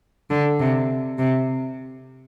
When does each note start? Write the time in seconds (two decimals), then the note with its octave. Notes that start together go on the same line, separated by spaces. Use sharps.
0.30 D3
0.60 C3
1.18 C3